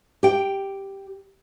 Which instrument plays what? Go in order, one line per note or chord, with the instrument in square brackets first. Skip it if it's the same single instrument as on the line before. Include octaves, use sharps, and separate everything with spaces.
[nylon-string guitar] G4 G5